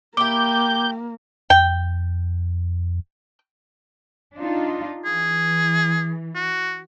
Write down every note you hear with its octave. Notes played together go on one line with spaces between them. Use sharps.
A#3 E4 G4 D6 G6
F2 G5
D4 D#4 F4
E3 G#4
F#4